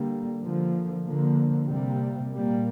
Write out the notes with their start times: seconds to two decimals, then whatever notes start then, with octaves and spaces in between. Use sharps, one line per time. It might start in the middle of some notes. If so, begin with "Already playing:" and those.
Already playing: D3 G3 A#3
0.41 D3 F3 A#3
1.05 D3 F3 A#3
1.68 C3 G3 A#3
2.31 A#2 G3 A#3